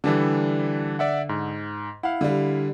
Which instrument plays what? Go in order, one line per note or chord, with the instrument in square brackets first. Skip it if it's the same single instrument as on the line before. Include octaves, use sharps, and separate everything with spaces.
[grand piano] D3 A4 [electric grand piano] E3 G3 D4
[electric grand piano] D5 E5 F#5
G#2
[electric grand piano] E4 F5 [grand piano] F#5
[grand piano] D3 G3